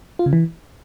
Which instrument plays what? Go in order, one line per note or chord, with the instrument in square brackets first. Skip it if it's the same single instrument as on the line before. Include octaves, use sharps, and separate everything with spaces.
[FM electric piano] F4
C#3
E3